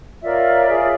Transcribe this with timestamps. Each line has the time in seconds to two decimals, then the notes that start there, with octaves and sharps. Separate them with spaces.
0.21 F4 A#4 C#5 D5 E5
0.68 F4 G#4 C#5